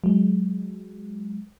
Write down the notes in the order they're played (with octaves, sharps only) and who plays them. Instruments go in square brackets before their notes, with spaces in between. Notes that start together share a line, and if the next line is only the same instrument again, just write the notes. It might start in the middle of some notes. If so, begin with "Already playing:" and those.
[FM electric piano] F#3 G#3